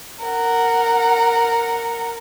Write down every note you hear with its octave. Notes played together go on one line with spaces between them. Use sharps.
A#4 F#5